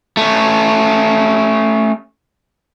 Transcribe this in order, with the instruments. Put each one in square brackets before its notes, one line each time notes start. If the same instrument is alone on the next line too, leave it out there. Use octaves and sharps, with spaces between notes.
[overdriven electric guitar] A3 C#4